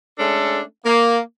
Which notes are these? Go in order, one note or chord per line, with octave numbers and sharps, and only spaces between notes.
G#3 A3 C#4 D4 A4
A#3